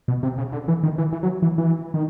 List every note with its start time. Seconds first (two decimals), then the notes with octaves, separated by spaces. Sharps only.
0.08 B2
0.23 C3
0.38 C#3
0.52 D3
0.68 E3
0.83 D#3
0.98 E3
1.13 E3
1.23 F#3
1.42 E3
1.58 E3
1.94 D#3